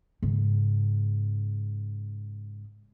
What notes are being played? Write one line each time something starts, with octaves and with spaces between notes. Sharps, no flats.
G#2 C#3